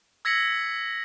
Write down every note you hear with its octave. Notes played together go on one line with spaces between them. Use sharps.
E6 G#6 A#6 B6 C#7 F#7